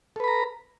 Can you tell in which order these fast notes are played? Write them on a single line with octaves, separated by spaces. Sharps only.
A4 B4 B5 A#5